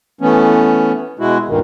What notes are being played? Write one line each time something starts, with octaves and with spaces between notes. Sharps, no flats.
E3 A3 B3 C#4
B2 G#3 E4 F#4
D2 G2 A#2 D#3